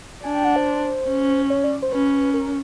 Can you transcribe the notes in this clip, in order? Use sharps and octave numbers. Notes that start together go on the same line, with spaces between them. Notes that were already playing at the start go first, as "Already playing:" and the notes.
D4 G#5
G5
F#5
C5
C#4
C#5
D5
C5
C#4 B4
A#4